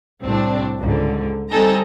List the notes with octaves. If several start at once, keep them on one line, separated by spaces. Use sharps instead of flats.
C2 A2 C4 D4
C#2 G#2 D3
G3 C4 D#4 A4 G#5 A#5